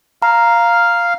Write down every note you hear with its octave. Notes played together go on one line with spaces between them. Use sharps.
F5 A#5